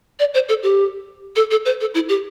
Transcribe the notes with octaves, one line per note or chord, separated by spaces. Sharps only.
D5
C5
A4
G4
A4
A4
C5
A4
E4
G4